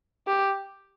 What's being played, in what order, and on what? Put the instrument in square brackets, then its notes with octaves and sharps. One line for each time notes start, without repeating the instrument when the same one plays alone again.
[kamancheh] G4